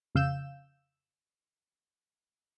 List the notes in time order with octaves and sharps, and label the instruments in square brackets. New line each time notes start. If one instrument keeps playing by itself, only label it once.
[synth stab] F2 C#3 F5 E6 G6 E7